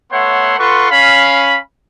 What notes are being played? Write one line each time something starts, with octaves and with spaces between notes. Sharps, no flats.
A3 B3 C#5 E5 F#5 C6
F4 A4 B4 F#5 C6 C#6
C#4 F5 B5